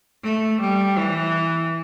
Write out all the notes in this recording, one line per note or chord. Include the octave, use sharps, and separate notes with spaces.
A3
G3
E3